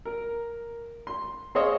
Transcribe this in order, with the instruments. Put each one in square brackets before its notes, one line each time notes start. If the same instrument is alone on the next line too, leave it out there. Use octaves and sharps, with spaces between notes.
[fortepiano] A#4
C6
G#4 C5 C#5 D#5 F5